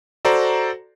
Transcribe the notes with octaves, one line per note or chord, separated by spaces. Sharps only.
F#4 A4 C5 D5 A#5